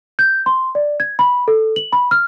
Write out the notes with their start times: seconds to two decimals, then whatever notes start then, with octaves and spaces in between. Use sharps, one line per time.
0.19 G6
0.46 C6
0.75 D5
1.00 G#6
1.19 B5
1.48 A4
1.76 F#7
1.93 B5
2.11 F6